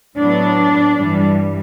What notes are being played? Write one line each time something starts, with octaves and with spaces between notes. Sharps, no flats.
A2 F#3 B3 D4
G2 E3 G3